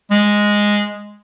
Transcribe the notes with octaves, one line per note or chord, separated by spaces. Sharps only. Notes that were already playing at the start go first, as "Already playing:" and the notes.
G#3